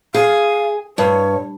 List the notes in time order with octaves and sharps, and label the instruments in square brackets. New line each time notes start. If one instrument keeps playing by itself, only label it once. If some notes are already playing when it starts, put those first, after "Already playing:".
[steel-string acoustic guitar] G#4 [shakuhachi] F5
[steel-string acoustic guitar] G2 [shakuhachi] C#5